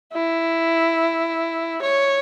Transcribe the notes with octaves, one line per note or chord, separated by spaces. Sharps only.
E4
C#5